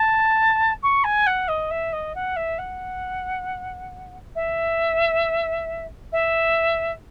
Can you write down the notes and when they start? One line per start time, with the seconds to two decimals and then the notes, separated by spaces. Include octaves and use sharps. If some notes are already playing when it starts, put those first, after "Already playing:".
Already playing: A5
0.83 C#6
1.04 G#5
1.27 F#5
1.48 D#5
1.71 E5
1.93 D#5
2.15 F#5
2.36 E5
2.58 F#5
4.35 E5
6.12 E5